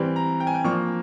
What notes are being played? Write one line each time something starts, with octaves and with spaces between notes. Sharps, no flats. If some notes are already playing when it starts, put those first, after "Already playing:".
Already playing: E3 G3 C4
A#5
G5
G#5
G5
F3 A#3 D4 C#6